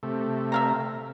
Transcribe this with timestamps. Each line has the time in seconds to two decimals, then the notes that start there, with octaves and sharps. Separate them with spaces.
0.03 C3 A3
0.52 E5 F5 A#5